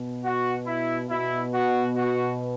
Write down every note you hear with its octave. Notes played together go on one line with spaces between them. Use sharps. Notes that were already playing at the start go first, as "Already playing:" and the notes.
Already playing: B2
F#4
E4
B2 E4
F#4
F#4